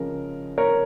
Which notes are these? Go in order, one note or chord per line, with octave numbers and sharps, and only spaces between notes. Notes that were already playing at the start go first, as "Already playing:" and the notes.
Already playing: C#3 F3 G#3 C#4 A#4
A#4 C#5